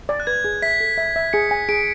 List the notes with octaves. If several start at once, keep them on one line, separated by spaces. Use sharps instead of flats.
D5
F#6
B4 G#6
G#4
E5 B6
A4
E5
E5
G#4 C#7
G#5
G#4 D7